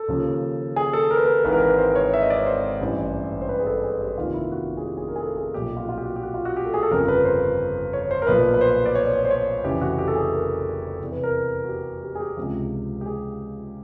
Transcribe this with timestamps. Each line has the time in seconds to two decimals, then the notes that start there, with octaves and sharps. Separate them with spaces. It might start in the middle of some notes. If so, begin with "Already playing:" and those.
Already playing: A4
0.08 D#2 C#3 F3
0.76 G#4
0.93 A4
1.11 A#4
1.17 B4
1.25 A#4
1.44 G#1 G#2 E3 B4
1.53 A#4
1.61 B4
1.78 C5
1.95 C#5
2.14 E5
2.22 D#5
2.30 D5
2.38 C#5
2.46 C5
2.80 A1 G2 E3
3.41 C5
3.49 B4
3.60 G#4
3.66 A4
3.84 G#4
4.01 G4
4.18 F1 D#2 D#3 F4
4.34 E4
4.52 F#4
4.77 G#4
4.86 G4
4.97 G#4
5.08 A#4
5.16 G#4
5.20 A4
5.37 G#4
5.54 B1 A#2 F3 G4
5.77 F4
5.84 F#4
5.89 F4
5.98 G4
6.05 F#4
6.16 G4
6.23 F#4
6.34 F4
6.45 F#4
6.56 G4
6.65 A4
6.74 G#4
6.83 A4
6.91 G1 F2 C#3 F3 A#4
7.08 B4
7.25 C5
7.93 C#5
8.11 C5
8.22 A#4
8.27 B1 A#2 F3 B4
8.54 B4
8.61 C5
8.86 D5
8.95 C#5
9.13 C#5
9.25 C5
9.30 C#5
9.64 F1 F2 C#3 E3 G4
9.81 F#4
9.99 G4
10.08 A4
10.15 G#4
10.33 A#4
11.00 E2 C3 E3
11.12 B4
11.23 A#4
11.64 F#4
11.69 G4
12.03 G4
12.15 G#4
12.20 G4
12.37 C#2 C3 F3
13.01 G4
13.06 G#4